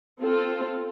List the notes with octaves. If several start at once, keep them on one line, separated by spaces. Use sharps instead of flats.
C4 F4 A4